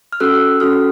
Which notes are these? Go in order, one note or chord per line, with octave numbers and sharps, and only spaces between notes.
F6
C#4 F#4 A4 E6 F#6
C#4 F#4 A4 D#6 F6